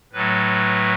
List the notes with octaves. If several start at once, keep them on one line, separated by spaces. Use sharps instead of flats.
A2 F#3 A3 B4